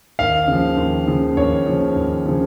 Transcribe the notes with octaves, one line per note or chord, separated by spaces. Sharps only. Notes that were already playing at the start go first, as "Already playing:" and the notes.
D#2 F5
C#3 F3
D#2
C#3 F3
D#2 C#5
C#3 F3
D#2
C#3 F3